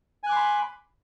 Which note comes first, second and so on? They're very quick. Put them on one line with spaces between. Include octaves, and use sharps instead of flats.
G#5 F#6 D6 C6 B5